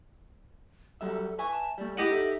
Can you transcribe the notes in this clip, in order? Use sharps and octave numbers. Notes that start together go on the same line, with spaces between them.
F#3 G3 A4 E5
B4 E5 G#5 C#6
A5
G3 A3 D5
E4 G4 D#5 F#5
D#4 A4 E5